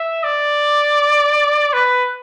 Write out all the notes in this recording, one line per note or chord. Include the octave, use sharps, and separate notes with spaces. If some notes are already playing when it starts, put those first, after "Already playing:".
Already playing: E5
D5
B4